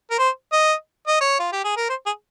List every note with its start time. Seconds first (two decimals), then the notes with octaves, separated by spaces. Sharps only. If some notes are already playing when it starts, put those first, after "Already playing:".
0.11 A#4
0.19 C5
0.52 D#5
1.07 D#5
1.21 C#5
1.40 F4
1.52 G4
1.64 G#4
1.77 A#4
1.89 C5
2.06 G#4